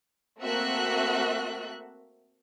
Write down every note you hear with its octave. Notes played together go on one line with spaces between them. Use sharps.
A3 A#3 C4 F#4 E5 F#6